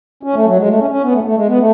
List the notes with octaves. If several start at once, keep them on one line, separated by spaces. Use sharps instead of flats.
C#4
A3
F#3
G#3
A3
C#4
C#4
B3
A3
A3
G#3
B3
A3